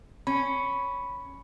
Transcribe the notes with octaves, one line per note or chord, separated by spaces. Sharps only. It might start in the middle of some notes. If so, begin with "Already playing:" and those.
C#4 B5